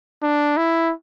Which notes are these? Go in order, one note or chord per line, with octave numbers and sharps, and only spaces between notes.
D4
E4